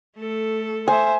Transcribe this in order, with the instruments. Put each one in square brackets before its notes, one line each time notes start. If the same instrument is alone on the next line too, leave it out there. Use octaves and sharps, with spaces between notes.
[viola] A3 A4
[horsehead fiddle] C5 E5 [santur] G#5